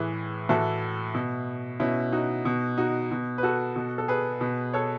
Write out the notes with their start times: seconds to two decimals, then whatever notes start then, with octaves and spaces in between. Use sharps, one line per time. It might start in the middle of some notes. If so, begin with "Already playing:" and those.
Already playing: A2 E3 G#4 B4
0.49 A2 E3 F#4 A4
1.15 B2
1.80 B2 C#4 E4
2.12 D#4 F#4
2.45 B2
2.78 D#4 F#4
3.11 B2
3.38 B4
3.43 F#4 A4
3.76 B2
3.98 A4
4.08 G#4 B4
4.41 B2
4.73 A4 C#5